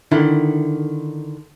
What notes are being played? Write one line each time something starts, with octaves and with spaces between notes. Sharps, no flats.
D3 D#3 E4